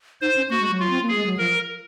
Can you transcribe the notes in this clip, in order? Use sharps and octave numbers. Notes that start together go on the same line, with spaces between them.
D#4 C5
C#4
A#3 F#4
G#3
F#3
F4
C4
A#3
G#4
G#3
F#3
F3 A#4